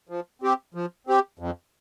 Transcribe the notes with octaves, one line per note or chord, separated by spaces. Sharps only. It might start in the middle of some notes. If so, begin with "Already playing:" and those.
F3
C4 G4
F3
C4 G4
F2